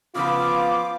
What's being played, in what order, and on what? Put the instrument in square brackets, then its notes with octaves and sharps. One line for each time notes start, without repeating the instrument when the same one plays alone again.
[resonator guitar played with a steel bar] C#3 F3 B4 [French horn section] B3 F4 [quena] D6